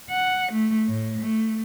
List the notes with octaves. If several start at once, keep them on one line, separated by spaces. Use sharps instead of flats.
F#5
A3
A2
A3